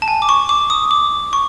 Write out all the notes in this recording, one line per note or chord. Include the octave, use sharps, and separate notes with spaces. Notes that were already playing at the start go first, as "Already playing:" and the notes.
A5
G#5
D6
C#6
D6
D#6
D6
C#6